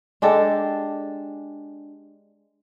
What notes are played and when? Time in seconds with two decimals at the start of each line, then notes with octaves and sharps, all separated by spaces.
0.22 G#3 D4 G4 A4